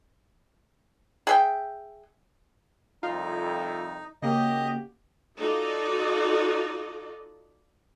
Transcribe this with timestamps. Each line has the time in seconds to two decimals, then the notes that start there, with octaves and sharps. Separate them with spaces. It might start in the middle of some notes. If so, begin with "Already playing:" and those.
1.27 G#4 E5 G5
3.03 C2 F2 D#4 F4
4.22 C#3 A#3 F#4 G4 D#5
5.39 D#4 F4 F#4 A4 D5 D#5